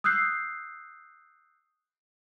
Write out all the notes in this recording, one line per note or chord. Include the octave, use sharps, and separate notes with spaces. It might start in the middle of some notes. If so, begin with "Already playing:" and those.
D#6 E6 F#6 G6 C7